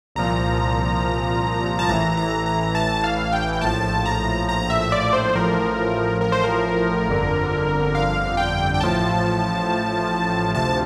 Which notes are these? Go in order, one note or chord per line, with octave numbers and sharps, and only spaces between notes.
C2 A#2 F3 A#5
A5
A1 A2 E3 A#5
A#5
A#5
A5
F5
G5
G5
A#1 A2 F3 A5
A#5
A#5
E5
D5
C5
A1 A2 F3 A#4
A#4
C5
A#4
G1 F2 D3
F5
G5
G5
A1 A2 F3 A5
D2 C3 F3 A5